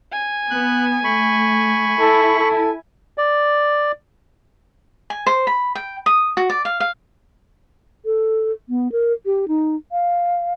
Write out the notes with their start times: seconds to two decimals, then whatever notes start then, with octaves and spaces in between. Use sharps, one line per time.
0.12 G#5
0.51 B3 F#6
1.04 A3 B5 C#6
2.00 E4 A4
2.39 A4
3.18 D5
5.10 G#5
5.26 C5
5.47 B5
5.75 G5
6.06 D#6
6.37 F#4
6.50 D5
6.65 F5
6.80 F5
8.05 A4
8.69 B3
8.92 A#4
9.26 G4
9.48 D#4
9.92 F5